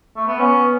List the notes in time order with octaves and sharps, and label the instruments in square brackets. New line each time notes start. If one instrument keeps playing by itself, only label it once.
[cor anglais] A3
B3
[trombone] B3 [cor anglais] C#4